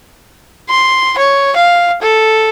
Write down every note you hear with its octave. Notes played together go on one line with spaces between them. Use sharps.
C6
C#5
F5
A4